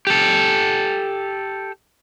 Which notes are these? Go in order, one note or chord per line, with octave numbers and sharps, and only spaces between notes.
G4 A4